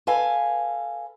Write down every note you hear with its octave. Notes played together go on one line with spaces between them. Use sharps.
A4 B4 F5 G#5